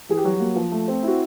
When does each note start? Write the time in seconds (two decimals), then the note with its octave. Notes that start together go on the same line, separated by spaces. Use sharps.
0.09 E3 G#4
0.17 G4
0.24 F#3 G3 F#4
0.40 A#3
0.56 F3
0.72 A3
0.88 C4
1.03 E4 F#4